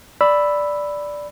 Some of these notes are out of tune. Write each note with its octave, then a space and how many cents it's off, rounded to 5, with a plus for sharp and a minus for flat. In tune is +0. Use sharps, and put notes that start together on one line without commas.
D5 +0 B5 +0 E6 +0